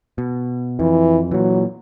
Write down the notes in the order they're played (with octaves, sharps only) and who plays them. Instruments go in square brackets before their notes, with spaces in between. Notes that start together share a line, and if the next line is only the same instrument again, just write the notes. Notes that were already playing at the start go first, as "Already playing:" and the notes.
[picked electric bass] B2
[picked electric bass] F2 [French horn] E3
[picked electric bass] A#2 E3 [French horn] F#3